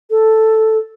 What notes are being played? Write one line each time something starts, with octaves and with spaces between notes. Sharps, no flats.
A4